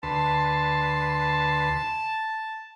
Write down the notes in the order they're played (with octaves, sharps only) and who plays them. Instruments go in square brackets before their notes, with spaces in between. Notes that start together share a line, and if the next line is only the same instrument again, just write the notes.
[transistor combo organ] D2 B4 C6 [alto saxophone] A5